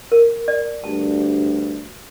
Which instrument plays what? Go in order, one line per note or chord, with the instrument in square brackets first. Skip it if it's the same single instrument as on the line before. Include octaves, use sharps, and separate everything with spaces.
[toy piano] A#4
D5
[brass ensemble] D2 G2 [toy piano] A5